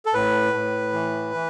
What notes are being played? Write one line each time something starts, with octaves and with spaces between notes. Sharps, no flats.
A4
A2 B4
A2
E3
E3